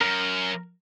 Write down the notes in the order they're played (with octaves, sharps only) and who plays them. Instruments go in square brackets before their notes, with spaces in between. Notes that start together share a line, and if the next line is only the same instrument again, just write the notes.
[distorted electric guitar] F#2 [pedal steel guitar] A#4